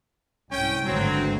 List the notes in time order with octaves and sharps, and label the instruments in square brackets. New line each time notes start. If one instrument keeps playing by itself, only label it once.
[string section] C2 G#2 [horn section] C#4 G5
[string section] G#1 D2 G2 [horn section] F#3 C4